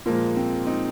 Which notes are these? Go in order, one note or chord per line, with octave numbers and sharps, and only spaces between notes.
A#2 F3 G#3 A#3
C4
C4 D#4